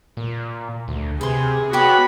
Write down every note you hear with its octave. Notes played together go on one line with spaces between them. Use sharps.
A#2
D2
C3 G#4 B4 C6
B3 F#4 C#5 G5 B5 D6